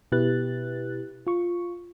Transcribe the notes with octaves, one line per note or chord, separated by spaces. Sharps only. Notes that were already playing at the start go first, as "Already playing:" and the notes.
B2 E4 G4 B4 F#6 A6
F4 C#6